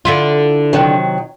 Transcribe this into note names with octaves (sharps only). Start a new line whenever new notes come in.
D3 E4 F4
C3 D#3 F#3